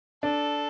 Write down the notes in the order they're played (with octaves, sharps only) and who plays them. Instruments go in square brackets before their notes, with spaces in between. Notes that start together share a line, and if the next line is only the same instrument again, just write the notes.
[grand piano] D4 [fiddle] A4